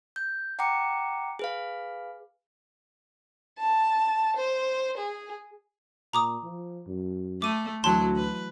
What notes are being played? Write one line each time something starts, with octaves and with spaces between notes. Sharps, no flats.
G6
F#5 G5 A#5 D6 C#7
G#4 B4 F5
A5
C5
G#4
A#2 A#5 D6 D#6
F3
F#2
A3 D6 D#7
D2 E3 F#3 A5 C6
B4